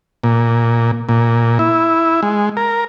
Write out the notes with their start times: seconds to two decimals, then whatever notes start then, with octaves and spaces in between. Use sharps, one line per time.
0.24 A#2
1.09 A#2
1.59 E4
2.23 G#3
2.57 A#4